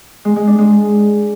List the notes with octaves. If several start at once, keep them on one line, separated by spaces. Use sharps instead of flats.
G#3
G#3
D4
G#3